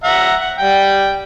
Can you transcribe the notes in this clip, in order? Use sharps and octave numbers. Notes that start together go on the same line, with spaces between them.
E5 F#5 A#5
F#5
G3 G5